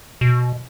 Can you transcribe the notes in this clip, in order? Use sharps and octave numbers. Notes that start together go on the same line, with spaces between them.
B2